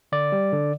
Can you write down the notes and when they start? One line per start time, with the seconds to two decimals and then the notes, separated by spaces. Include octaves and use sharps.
0.12 D3 D5
0.32 G3
0.53 D3